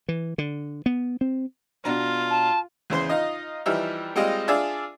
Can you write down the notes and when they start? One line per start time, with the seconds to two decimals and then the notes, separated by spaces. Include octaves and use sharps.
0.09 E3
0.38 D3
0.86 B3
1.21 C4
1.85 B2 D4 F4 A#5
2.30 A5
2.90 E2 C#3 C5 C6
3.09 D#4 F4 D#5
3.66 E3 F3 G3 D#4 E5 F6
4.16 G3 G#3 C4 F4 D#5
4.48 D4 F4 G#4 D5 E5